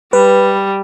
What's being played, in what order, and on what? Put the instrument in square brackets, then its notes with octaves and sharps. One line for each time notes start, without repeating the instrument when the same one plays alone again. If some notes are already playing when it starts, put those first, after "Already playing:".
[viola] G3 [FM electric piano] B4